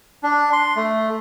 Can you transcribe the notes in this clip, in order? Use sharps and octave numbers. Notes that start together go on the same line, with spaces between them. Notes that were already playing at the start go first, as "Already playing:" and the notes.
D4
C6
A3